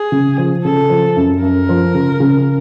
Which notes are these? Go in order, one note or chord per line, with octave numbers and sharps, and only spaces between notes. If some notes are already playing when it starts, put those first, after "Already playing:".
Already playing: G#4
C#3
F3
C#3 A4
F3
F#2
F#2 A#4
F3
C#3
C#3